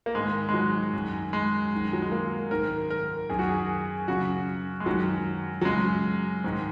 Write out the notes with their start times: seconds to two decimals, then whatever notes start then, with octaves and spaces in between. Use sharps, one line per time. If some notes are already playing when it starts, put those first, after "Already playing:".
0.06 A#3
0.15 G#2 D#3 G#3
0.49 G#3
0.54 F#3
0.93 F#2 D#3
1.33 G#3
1.73 F#2 D#3
1.93 F#3
2.02 G#3
2.12 A#3
2.51 G#2 D#3 A#4
2.90 A#4
3.30 F#2 D#3 G#4
3.39 F#4
3.49 G#4
4.08 F#2 C#3 F#4
4.80 G#3
4.86 F#2 D#3 F#3
5.61 F#3
5.65 F#2 C#3 G#3
6.44 G#2 D#3